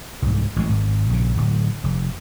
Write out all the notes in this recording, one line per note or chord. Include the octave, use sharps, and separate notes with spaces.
C2 G#2
A1 G#3
G#1
A#1 C#3
D1
F1